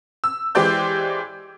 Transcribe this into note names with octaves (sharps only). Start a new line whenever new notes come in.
E6
E3 G#3 G4 C5 D5 G6